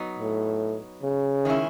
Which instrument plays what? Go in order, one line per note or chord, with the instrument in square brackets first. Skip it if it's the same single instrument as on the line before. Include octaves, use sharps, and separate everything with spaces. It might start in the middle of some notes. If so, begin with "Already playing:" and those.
Already playing: [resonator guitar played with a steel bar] F#3 B3 D#4
[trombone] A2
C#3
[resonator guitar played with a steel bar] D#3 G#3 C#4 E4